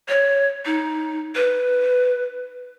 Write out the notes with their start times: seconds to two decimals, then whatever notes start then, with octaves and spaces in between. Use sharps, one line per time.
0.09 C#5
0.65 D#4
1.35 B4